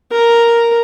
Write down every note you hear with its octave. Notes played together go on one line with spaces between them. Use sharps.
A#4